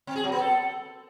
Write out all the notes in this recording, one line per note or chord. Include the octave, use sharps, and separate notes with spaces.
C4
G#4
F#3
B3
A4